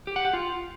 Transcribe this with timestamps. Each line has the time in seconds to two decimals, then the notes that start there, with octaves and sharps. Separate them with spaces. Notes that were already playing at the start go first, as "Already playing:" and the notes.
0.07 G4
0.16 F#5
0.25 G4
0.33 F4